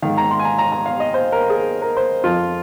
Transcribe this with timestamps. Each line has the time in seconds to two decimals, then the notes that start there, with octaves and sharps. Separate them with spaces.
0.02 G#2 D#3 F5
0.17 A#5
0.31 C6
0.39 G#5
0.45 A#5
0.58 A#5
0.72 A#5
0.86 F5
1.00 D#5
1.14 C5
1.32 A#4
1.50 G#4
1.82 A#4
1.97 C5
2.24 F2 F3 F4